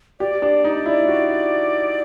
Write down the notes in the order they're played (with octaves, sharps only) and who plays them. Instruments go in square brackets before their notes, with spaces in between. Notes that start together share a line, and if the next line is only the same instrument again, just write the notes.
[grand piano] G4 [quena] D5
[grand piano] D4
D#4
E4
F#4